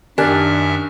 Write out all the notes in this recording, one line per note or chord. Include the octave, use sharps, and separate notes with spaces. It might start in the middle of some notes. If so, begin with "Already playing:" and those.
F#2 D#3 D4 G4 E5 G#5 F6 F#6